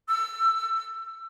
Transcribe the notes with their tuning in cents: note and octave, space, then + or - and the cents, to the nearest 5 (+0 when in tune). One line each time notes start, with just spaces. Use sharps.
E6 +20